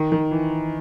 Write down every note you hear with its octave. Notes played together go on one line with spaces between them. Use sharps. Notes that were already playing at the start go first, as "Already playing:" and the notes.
Already playing: D#3
D#3
E3